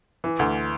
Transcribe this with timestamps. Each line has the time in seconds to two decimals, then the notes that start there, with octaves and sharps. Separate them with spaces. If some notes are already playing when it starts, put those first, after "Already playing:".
0.24 E3
0.39 D2